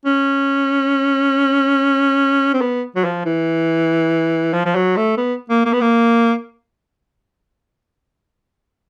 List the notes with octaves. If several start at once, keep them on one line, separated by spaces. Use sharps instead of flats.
C#4
C4
B3
F#3
F3
E3
F3
F3
F#3
A3
B3
A#3
A#3
B3
A#3